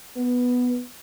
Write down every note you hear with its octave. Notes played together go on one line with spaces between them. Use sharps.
B3